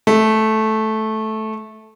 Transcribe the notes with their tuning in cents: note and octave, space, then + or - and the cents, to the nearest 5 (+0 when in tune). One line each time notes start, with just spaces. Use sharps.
A3 -10